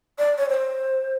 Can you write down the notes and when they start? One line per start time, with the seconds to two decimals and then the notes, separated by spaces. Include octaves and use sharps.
0.19 D5
0.38 C#5
0.49 C5